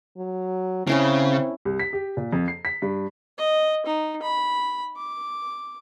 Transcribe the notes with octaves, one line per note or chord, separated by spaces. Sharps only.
F#3
C#3 C4 C#4 E4 A#4
C2
B6
G4
A#2
F2
C7
B6
G2
D#5
D#4
B5
D6